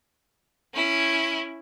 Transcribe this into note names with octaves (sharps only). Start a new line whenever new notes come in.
C#4 E4